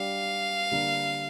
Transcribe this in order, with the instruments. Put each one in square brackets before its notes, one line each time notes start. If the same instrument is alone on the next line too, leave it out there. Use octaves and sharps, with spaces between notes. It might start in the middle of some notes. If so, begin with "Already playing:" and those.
Already playing: [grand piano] G3 D4 G4 [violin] F5
[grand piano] D3 G3 A#3